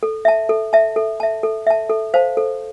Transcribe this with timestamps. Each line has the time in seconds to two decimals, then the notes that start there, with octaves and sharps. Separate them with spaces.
0.03 A4
0.25 E5 A5
0.49 A4
0.73 E5 A5
0.96 A4
1.20 E5 A5
1.43 A4
1.67 E5 A5
1.90 A4
2.14 C5 F5 A5
2.37 A4